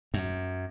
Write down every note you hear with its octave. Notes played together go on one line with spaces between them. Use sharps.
F#2